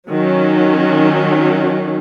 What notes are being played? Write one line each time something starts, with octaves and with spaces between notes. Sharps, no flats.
D#3 F#3 C#4